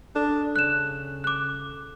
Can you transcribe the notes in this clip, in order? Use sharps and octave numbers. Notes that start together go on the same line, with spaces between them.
D4 A4
C#3 F#6 E7
D6 F#6